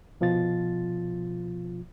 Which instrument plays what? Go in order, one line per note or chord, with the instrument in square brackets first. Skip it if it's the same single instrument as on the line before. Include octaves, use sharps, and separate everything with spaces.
[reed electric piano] C2 B2 F3 F4 A6